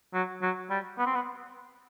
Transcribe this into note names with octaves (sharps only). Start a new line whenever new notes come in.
F#3
F#3
G3
B3
C4
B3